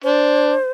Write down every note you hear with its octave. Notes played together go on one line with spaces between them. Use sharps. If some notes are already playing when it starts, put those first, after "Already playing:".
D4 C5